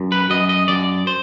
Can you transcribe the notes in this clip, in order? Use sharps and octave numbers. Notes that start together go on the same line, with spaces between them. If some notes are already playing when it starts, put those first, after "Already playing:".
Already playing: F#2
B4
F#2 D#5
D#5
F#2 D5
C5